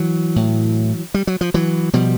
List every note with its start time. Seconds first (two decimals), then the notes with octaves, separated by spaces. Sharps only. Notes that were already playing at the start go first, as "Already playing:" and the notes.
Already playing: E3 F#3
0.36 A2
1.14 G3
1.27 F#3
1.41 F3
1.54 E3 F#3
1.93 B2 F3 G3